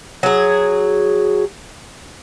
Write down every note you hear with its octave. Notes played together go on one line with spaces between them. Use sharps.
F#3 G#4